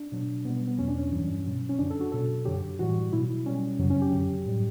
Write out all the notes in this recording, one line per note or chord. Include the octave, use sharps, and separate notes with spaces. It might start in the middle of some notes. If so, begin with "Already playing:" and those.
Already playing: D4
B2 F#3
B2 G3 B3
B3
B3
E2 B2 F#3 C#4
D4
C#4
G2 E3 G3
B2 F#3
C#4
F#2 D3 F#3 D4
A4
F#4
B2 F#3 A4
F#2 D3 F#3 G4
A2 E3 G3 F#4
B2 F#3 E4
B2 G3 C#4
F#2 C#3 F#3
C#4
G4
F#2 D3 F#3
A2 G3